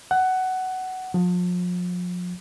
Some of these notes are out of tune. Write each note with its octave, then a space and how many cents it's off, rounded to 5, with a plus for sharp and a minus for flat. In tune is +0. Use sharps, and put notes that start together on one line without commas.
F#5 +15
F3 +40